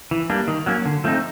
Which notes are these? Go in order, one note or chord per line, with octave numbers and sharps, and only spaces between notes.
E3
G3 A#3 D4
D#3
F#3 A#3 C#4
D3
F3 A3 C4 D#4